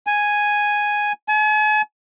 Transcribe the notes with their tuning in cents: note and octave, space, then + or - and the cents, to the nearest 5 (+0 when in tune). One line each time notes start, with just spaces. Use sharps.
G#5 +0
G#5 +45